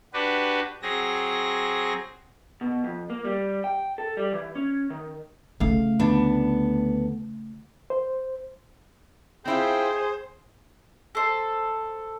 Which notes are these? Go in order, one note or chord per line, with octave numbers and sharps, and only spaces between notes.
D4 F#4 G4 B4
F#3 C4 G#4 A#6
B2
F2
A#3
G3
G5
A4
G3
E3
C#4
D#3
C#3 A3 F5
D2 B3 D4
C5
C4 E4 F4 G#4 C5 G5
A4 C5